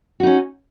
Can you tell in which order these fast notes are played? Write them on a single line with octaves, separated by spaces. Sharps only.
F#4 D#4 C#4